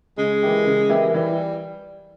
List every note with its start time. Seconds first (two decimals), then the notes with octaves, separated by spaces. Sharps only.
0.18 C#3 G#3
0.42 E3 A#3 E4 G4
0.66 C#3
0.89 E3 A#3 E4 G4
1.14 E3 G3